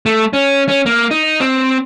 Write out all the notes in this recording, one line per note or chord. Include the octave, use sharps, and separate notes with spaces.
A3
C#4
C#4
A#3
D#4
C4